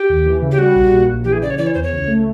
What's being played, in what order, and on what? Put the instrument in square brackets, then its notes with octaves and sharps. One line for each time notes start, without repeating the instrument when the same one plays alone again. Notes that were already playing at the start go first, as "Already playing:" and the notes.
Already playing: [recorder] G4
[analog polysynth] D#2
E3
C#3
[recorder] G4
[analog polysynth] G3 [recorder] F#4
[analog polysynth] A#1
A#2
A#1
[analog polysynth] E3 [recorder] G4
[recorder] G#4
[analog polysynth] C#3 [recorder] D5
[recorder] C#5
[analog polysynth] E3 [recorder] D5
[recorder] C#5
[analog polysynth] E2 [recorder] C5
[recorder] C#5
[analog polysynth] C#2
A3